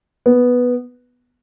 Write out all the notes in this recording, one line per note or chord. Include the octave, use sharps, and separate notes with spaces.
B3